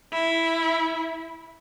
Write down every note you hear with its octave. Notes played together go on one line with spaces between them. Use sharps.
E4